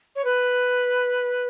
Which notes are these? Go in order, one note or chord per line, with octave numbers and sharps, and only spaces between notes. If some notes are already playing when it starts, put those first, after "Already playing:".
C#5
B4